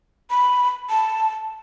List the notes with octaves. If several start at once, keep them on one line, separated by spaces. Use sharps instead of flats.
B5
A5